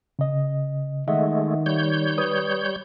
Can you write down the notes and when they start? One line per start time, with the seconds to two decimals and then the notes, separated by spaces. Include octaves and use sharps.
0.19 C#3 D#5
1.08 D#3 G#3 A3 D#5 E5 F#5
1.66 G3 C#5 G6
2.18 B4 D#6